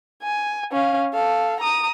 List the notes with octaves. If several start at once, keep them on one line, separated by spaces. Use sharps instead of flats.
G#5
C#4 F5
A4 F5
A#5 D#6